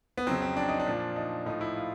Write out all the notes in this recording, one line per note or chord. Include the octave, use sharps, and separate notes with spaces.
B3
F2 C#3 F#3 C4
C4
D4
D#4
D4
A#2 F3
D#4
A2 F3 D#4
E4
F4